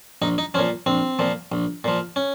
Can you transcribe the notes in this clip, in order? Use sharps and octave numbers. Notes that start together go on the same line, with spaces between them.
A#1 D#4
D#4
A#2 F3 C#4
A#1 C4
A#2 F3
A#1
A#2 F3
C#4